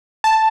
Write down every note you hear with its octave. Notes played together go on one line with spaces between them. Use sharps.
A5